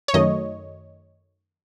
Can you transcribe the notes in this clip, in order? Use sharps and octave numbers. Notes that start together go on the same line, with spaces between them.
C#5
F#2 D#3 F#3 A3 D#5